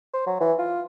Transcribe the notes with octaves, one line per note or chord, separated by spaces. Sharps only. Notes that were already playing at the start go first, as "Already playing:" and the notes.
C5
F#3
E3
F4